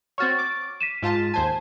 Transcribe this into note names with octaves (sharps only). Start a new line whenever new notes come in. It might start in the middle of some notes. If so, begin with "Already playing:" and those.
C4 F#4 C#5 C#6 F6 A6
D6
B6 D#7 E7
G#2 F4 A5
D#2 C5 G#5 A5